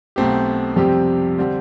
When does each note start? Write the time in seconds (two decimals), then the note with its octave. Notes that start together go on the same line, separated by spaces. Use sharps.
0.16 B1 B2 A3 C4 G4
0.76 F2 C3 G3 C4 G4
1.38 D3 G3 C4